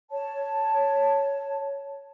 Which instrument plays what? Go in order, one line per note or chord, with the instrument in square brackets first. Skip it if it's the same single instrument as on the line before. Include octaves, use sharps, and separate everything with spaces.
[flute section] C#5 A5